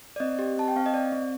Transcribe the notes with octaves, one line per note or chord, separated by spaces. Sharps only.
D5
C4 D#5
G4
C4 A5
G5
C4 F5
D#5
C4 D5
C4